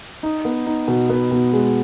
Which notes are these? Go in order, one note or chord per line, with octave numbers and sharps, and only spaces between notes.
D#4
B3
D#4
B2
B3
B2
G#3